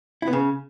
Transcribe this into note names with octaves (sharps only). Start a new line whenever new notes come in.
E4
B3
C#3